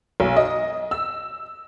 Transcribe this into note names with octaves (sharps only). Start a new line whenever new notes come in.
B1
D#5
E6